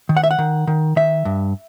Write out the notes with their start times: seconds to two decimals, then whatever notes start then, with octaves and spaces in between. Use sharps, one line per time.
0.09 D#3
0.17 F#5
0.24 E5
0.31 F#5
0.39 D#3
0.67 D#3
0.96 D#3 E5
1.25 G2